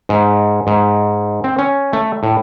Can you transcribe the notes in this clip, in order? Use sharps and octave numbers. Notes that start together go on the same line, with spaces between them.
G#2
G#2
C4
C#4
A3
A2